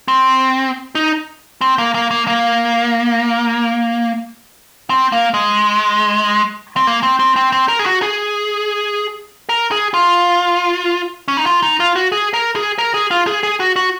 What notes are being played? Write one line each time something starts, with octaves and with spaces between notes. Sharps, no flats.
C4
D#4
C4
A#3
A#3
A#3
A#3
C4
A#3
G#3
C4
A#3
C4
C4
C4
C4
A#4
G#4
F#4
G#4
A#4
G#4
F4
C#4
D#4
F4
D#4
F4
F#4
G#4
A#4
G#4
A#4
G#4
F4
G#4
G#4
F#4
F#4